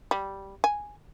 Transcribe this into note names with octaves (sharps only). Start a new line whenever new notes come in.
G3
G#5